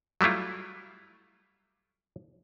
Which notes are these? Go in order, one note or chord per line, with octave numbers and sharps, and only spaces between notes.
F#3 G3 A3 E4 F4